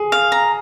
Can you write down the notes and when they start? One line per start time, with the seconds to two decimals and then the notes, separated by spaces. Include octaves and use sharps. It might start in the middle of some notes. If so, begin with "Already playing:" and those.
Already playing: G#4
0.12 F5
0.32 A#5